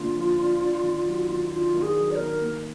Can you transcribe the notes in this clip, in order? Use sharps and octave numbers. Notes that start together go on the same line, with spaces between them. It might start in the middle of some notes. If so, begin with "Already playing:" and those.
Already playing: D3 F3 A#3 D4 F4
F3
D4
D4
D#3
F#3
D#3
D4 F4
D#3
G#4
F#3
D5
D#3 A#4
A#3